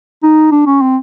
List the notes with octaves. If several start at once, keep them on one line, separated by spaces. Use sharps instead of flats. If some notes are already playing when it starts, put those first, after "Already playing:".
D#4
D4
C#4
C4